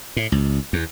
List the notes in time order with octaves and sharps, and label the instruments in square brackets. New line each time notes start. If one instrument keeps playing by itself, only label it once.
[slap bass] A2
C#2
E2